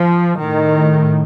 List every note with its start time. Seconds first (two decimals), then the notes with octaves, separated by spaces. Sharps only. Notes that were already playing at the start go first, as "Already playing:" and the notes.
Already playing: F3
0.37 A2 D#3